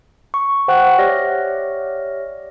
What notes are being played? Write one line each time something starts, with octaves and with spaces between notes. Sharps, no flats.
C#6
C5 F#5 G5 C#6 F#6
G4 C#5 D5 E5 F6 A#6